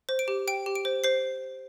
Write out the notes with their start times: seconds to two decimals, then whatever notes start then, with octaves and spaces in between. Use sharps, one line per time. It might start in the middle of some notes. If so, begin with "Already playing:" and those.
0.09 C5
0.19 D7
0.28 G4
0.47 G5 D7
0.66 G4
0.75 D7
0.85 C5
1.04 C5 C7